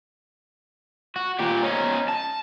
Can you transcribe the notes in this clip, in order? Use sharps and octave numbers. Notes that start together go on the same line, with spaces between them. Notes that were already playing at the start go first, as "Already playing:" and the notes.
F#4
A#2 G4
C#4 D#4
A5